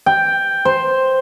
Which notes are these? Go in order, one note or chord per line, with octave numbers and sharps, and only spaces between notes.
G5
C5